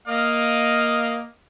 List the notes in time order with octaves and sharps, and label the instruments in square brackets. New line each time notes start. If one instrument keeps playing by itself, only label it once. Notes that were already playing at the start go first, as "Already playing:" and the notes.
[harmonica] A#3 D#5 F5